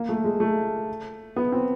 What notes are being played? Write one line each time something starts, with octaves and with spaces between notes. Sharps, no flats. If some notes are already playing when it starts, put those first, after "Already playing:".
Already playing: A#3
A3
G#3
A3
B3
C4